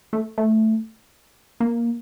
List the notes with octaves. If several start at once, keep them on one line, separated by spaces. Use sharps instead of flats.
A3
A3
A#3